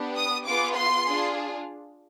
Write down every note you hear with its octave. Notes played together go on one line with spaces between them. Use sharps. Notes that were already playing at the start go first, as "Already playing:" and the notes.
Already playing: B3 D4 G4
D#6
B3 F4 G#4 D6
C6
D4 F4 G#4